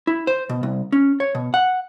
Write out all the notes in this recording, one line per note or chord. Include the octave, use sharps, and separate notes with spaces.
E4
C5
B2
C2
C#4
C#5
B2
F#5